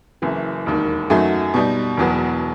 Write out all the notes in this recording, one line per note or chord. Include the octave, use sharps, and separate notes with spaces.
F#1 F#2 E3
E1 D#2 D#3
F#2 D#3 F#3 A3 D#4
B2 G3 D#4
E1 E2 B2 F#3 B3